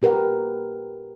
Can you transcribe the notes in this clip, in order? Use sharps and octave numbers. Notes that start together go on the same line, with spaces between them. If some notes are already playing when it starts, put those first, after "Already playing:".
A#2 G4 A#4 B4 F#5